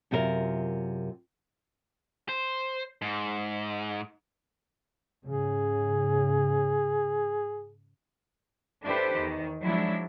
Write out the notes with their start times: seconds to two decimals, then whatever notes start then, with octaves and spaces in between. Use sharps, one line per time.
0.11 F#2 C3 F4 F#4 A#4
2.29 C5
3.02 G#2
5.26 G#2 C#3 G#4
8.84 D4 E4 G4 A4 B4 C5
9.16 E2 D#3
9.63 F3 F#3 G#3 D4 E4